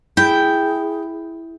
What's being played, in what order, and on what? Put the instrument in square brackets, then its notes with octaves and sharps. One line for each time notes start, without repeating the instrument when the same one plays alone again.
[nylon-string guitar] E4 [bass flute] G#4 [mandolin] G5